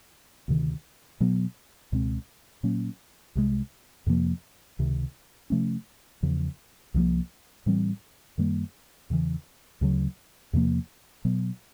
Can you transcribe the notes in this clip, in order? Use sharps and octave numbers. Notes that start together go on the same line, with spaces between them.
D2 C3 D#3
B2 F#3 B3
C#2 B2 G#3 C4
A#2 F#3 A#3 C#4
C2 C3 D#3 G#3
F2 C3 F3 A#3
C#2 C3 D#3
C3 F3 A3 C#4
E2 C#3 F3
C2 A#2 F3 A#3
A2 E3 G3 C4
F#2 D#3 G3 A#3
E2 C#3 E3
D2 C#3 F#3
E2 C3 F3 A#3
B2 F#3 B3